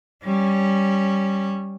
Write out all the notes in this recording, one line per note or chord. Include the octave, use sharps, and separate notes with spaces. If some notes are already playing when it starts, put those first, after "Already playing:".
G3 C#4